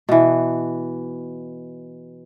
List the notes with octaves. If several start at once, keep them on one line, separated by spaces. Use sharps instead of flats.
B2 E3